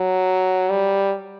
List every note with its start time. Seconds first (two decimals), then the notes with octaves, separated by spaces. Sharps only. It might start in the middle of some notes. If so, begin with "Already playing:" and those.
Already playing: F#3
0.70 G3